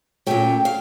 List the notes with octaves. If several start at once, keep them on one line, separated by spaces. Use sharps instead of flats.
A#2 F3 A3 C#4 G5
F5